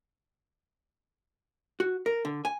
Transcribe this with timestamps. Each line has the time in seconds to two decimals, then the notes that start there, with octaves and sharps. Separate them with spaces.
1.80 F#4
2.06 A#4
2.25 D3
2.45 G#5